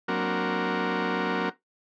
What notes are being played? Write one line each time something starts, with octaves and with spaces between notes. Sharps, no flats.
F#3 A#3 C4 D4 F#4 A#4